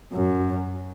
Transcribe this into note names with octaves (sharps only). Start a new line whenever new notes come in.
F#2